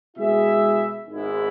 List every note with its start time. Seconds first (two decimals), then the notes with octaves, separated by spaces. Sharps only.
0.17 B2 G#3 E4 G#4 E5
1.08 G#1 G#2 G#3 B3 E4